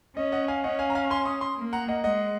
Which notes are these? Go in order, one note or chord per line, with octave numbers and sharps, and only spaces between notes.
C#4 D#5
D#5 F#5
F5 G#5
C#4 D#5 F#5
F5 G#5
A#5
F5 G#5
G#5 C6
C6 D#6
C6 D#6
A#3
F#5 A#5
D#5 F#5
G#3 D#5 F#5